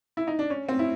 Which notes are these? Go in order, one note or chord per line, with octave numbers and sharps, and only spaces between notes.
E4
D#4
D4
C#4
C4
E4